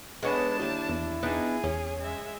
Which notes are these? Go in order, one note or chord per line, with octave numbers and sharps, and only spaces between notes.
G#3 B3 C#4 D4 B4 A5
D#2 E4 G4
E2
B3 D4 D#4 G#4
E2 C#4
G#3 E5